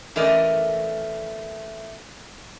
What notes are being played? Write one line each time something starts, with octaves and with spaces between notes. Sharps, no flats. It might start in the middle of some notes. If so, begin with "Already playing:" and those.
E3 A3 C#4 A#4 D5 D#5